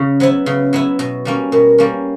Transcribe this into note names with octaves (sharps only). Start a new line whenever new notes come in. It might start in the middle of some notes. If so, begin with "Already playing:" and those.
Already playing: C#3
F#3 B3 E4 C5
C#3 B4
F#3 B3 E4
B2
G3 A#3 C#4
B2 A#4
G3 A#3 C#4